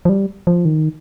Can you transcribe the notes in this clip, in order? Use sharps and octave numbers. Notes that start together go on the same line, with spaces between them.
F3
G3
F3
D#3